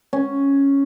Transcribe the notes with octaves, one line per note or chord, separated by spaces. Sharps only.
C#4